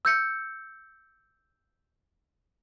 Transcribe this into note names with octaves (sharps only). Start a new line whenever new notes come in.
E6 G6 C#7